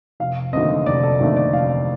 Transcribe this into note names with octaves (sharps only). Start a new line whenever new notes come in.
F1 F5
D#2 D3 A3 C4 D#5
F1 D5
A4
D#2 D3 A3 C4
D5
F1 F5